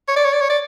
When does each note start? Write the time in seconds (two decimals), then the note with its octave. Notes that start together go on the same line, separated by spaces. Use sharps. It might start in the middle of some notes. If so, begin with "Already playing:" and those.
0.08 C#5
0.16 D5
0.25 C#5
0.33 D5
0.41 C#5
0.50 D5